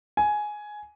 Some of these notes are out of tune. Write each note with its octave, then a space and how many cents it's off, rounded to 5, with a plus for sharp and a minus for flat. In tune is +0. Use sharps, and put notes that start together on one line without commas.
G#5 +10